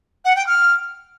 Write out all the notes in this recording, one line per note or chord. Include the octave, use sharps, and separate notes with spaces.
F#5
G5
F6